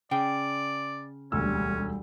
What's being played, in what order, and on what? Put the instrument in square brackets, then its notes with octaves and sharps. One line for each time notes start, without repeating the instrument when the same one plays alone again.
[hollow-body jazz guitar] C#3 G5 [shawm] D5
[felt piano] E1 D2 E6 [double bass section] G3 [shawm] C#4